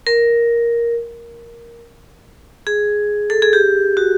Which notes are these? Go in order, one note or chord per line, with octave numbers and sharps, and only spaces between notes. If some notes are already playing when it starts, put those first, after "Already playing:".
A#4
G#4
A4
G#4
G4
F#4